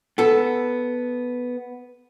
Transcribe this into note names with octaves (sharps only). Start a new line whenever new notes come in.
B3 A4